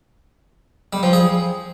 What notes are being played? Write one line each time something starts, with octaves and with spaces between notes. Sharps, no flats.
G3
F3
G#4